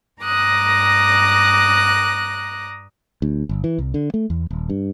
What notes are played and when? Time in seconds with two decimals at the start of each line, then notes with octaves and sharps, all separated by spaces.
0.21 G2 A#5 D6 D#6 F#6 A#6
3.22 D2
3.49 G1
3.64 E3
3.78 C2
3.94 D3
4.14 A3
4.30 E2
4.51 D#1
4.69 G2